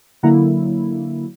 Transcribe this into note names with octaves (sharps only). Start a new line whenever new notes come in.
D3 F#3 A#3 E4 F#5 A#5